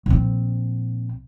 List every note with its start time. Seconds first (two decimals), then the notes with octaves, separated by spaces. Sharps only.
0.06 A#1 C4